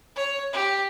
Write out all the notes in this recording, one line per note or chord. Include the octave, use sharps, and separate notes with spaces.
C#5
G4